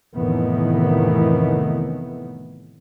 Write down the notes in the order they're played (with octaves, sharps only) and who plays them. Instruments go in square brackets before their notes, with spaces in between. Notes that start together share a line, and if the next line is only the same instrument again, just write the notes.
[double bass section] F1 A2 D#3 E3 B3